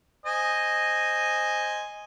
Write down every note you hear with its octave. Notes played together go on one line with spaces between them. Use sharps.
C5 D#5 G#5